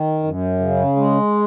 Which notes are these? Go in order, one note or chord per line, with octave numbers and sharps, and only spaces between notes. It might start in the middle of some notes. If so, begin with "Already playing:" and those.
Already playing: D#3
F#2
C#3
G#3